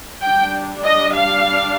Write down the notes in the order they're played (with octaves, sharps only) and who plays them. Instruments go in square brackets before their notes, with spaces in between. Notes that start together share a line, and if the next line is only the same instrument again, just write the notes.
[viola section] G3 D4 G5
D#5
F5